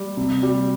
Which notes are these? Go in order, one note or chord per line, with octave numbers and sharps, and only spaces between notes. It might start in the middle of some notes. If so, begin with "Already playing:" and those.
Already playing: G3
C3
G3